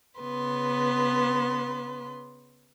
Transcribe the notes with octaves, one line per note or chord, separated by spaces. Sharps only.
C#3 B3 B4 C6